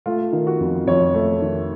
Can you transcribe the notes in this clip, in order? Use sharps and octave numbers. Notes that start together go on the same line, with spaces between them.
A3 F4
D#3
F#4
F2
F2 C#5
A3
D#3